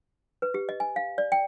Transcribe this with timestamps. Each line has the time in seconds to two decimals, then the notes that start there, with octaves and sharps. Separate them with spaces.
0.42 B4
0.54 G4
0.69 D#5
0.80 G#5
0.96 F5
1.18 D5
1.32 G5